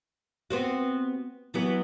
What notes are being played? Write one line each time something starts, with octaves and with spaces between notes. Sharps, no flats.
B3 C4 F#4
E3 F#3 B3